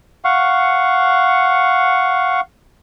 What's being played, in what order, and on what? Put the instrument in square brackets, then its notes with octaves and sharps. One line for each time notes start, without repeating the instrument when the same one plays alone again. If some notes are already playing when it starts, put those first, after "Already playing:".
[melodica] F5 F#5 C#6